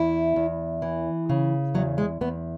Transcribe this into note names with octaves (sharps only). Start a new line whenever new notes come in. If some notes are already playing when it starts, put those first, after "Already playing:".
Already playing: E2 E4
E2
E3
C#3
E2 F#3
G#3
E2 B3